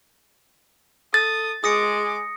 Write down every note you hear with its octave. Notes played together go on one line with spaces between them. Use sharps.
A4 D#6 A6
G#3 G#4 D6 D#6 A#6 C#7